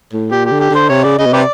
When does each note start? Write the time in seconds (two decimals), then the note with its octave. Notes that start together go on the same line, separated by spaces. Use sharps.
0.13 A2
0.32 A#2 G4
0.46 G4
0.51 D3
0.60 G4
0.71 D3 C5
0.89 C3 C#5
1.04 C#3 D5
1.19 C#3 D#5
1.26 B2
1.33 C3 G4 B4 D5